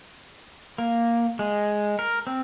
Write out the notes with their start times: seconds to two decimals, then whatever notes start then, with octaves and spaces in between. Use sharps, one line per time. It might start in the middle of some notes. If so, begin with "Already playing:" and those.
0.78 A#3
1.39 G#3
1.99 A#4
2.27 C4